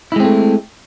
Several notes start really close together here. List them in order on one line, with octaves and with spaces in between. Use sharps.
E4 G#3 C4 A3